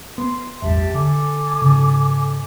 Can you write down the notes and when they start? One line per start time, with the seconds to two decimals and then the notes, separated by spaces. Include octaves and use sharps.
0.18 B3 C6
0.62 A1 E2 G2 G4 E5 A5
0.94 D3 A4 G#5 D6
1.62 G#2 C#3